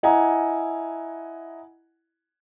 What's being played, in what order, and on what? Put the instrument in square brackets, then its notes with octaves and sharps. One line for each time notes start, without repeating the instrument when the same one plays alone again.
[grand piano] E4 D#5 F#5 G#5 A#5